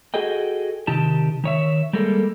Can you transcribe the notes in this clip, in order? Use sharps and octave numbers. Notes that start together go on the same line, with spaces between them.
F#4 G#4 A4 D#5 G5
C3 D#3 D#4 G4 A5
D#3 C#5 E5
G3 G#3 A#3 A4